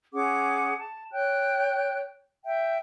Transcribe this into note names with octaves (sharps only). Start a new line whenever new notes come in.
C#4 G#4 F#5 D6
A5
C#5 G5 F#6
E5 G5